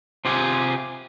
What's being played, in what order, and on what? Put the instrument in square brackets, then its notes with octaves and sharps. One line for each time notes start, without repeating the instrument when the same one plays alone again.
[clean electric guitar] C3 F4 G4 G#4